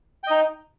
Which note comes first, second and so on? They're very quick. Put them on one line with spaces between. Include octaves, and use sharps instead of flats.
G5 D#5 D#4